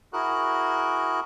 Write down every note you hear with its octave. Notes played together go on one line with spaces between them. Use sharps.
E4 F#4 G#4 A#4 F#6